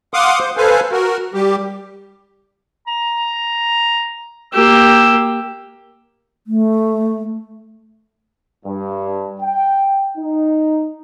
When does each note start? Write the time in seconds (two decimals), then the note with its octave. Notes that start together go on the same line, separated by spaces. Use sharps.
0.14 F5 F#5 C6 D6 D#6
0.39 C5
0.57 A4 B4 C5 F5 G#5
0.92 F#4 A#4
1.34 G3 G4
2.87 A#5
4.53 A#3 G4 E6
6.47 A3
8.65 G2
9.41 G5
10.18 D#4